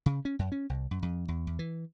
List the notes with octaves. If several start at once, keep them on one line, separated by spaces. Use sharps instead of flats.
C#3
C#4
F#2
C#4
C2
F#2
F2
E2
E2
E3